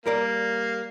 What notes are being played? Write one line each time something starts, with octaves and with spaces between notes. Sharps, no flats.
G3 A#3 A#4 D5